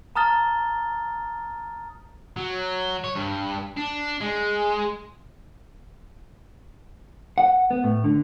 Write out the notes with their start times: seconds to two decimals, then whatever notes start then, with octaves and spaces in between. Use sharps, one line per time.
0.15 A5 A#5 D#6 F6 A6 G7
2.37 F#3
3.04 C#5
3.16 G2
3.77 D4
4.21 G#3
7.38 F#5
7.70 B3
7.84 A2
8.04 D3